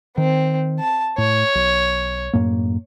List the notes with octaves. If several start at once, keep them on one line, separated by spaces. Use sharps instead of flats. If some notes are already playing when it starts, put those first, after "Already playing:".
D#3 C4
A5
A2 C#5
B1
F#2 A2 A#3